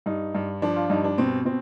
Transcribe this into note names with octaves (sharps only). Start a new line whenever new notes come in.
G2 D#4
G2
F3 D4
F4
G2 D#4
D4
B2 C4
B2 C4